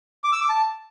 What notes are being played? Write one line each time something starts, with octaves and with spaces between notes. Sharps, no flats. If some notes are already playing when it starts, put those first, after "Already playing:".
D6
E6
D6
A5